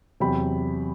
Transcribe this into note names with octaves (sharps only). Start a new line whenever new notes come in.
E2 C3 F#3 G5 B5